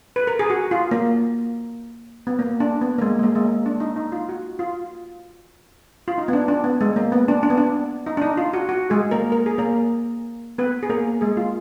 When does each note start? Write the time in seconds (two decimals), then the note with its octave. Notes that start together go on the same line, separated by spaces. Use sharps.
0.16 B4
0.27 A#4
0.39 G#4
0.50 F#4
0.71 F4
0.91 A#3
2.27 B3
2.39 A#3
2.60 D4
2.82 B3
2.98 A#3
3.02 G#3
3.19 G#3
3.23 A#3
3.35 G#3
3.45 A#3
3.66 D4
3.80 D#4
3.96 D#4
4.12 F4
4.29 F#4
4.59 F4
6.08 F4
6.18 D#4
6.28 B3
6.33 D4
6.48 D4
6.64 B3
6.81 G#3
6.96 A#3
7.12 B3
7.28 D4
7.43 D4
7.50 B3
7.57 D4
8.06 D#4
8.17 D4
8.22 D#4
8.37 F4
8.53 F#4
8.69 F#4
8.90 G#3 G#4
9.11 A#3 A#4
9.32 A#4
9.46 G#4
9.58 A#3 A#4
10.58 B3 B4
10.83 G#4
10.90 A#3 A#4
11.21 G#3 G#4
11.37 F4